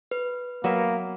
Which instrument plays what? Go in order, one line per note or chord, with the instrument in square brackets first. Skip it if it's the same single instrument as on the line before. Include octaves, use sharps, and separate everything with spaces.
[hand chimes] B4
[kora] F#3 B3 E5 [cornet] A#3